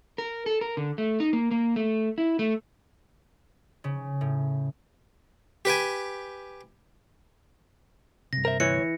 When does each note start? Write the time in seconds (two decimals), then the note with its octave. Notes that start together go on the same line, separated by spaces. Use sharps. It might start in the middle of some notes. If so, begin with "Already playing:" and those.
0.18 A#4
0.46 A4
0.61 A#4
0.77 D3
0.98 A3
1.20 D#4
1.33 A#3
1.51 A#3
1.76 A3
2.18 E4
2.39 A3
3.84 C#3
4.21 A2
5.65 G4 B4 G5 G#5
8.33 G2 C3 A#6
8.45 A#4 C5 E5
8.60 D2 E3 C#5 C#7